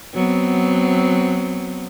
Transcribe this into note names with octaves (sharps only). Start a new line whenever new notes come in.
F#3 B3 C4